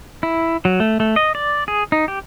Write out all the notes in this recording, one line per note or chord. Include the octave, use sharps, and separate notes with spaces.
E4
F#3
A3
A3
D#5
D5
G#4
D#4
G4